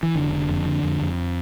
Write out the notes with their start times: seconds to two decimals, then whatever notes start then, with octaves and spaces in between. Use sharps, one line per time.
0.03 E3
0.15 F1 D3
0.32 D3
0.49 F2
0.66 D3
0.84 F2
1.01 F2